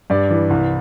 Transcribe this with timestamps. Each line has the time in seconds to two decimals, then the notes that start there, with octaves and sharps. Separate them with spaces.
0.10 G2 D5
0.30 E3
0.50 C2